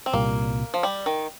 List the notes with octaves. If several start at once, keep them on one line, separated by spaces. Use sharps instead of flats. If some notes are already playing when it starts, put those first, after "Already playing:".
C4
C2 A#2 G3 A#3
F3
G3
D#3